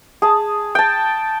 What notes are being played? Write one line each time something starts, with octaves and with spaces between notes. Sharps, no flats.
G#4 A5
G5 A5